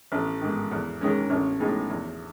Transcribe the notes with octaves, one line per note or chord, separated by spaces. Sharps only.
A1
G#2 D#3
E2
D#3 G#3 C#4
A1
A2 G#3 D#4 G#4
E2